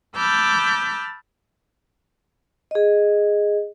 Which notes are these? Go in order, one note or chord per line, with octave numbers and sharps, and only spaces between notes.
A5 B5 D6 E6 F6 G6
G#4 D#5